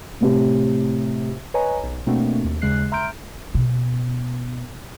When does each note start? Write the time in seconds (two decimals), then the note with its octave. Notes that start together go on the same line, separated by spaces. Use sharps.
0.21 A2 C3
1.54 B4 C#5 D#5 G#5 A#5
1.83 B1
2.07 B2 A3 A#3 C4 D4 F#4
2.44 D#2
2.62 D#2 C#3 G#3 F#6 C7
2.92 E5 A#5 C6 F6 G6 D7
3.55 B2